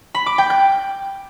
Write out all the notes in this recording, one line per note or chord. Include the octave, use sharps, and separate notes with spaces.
B5
D6
G5
G6